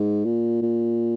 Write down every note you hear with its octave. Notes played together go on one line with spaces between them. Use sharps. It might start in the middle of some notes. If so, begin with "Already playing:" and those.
Already playing: G#2
A#2
A#2